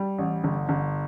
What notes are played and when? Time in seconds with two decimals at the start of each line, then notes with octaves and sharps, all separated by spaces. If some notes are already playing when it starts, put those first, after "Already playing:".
Already playing: G3
0.18 A1
0.44 G1
0.69 G1